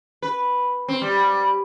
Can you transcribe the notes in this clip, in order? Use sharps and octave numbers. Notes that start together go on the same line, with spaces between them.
B4
C4
G3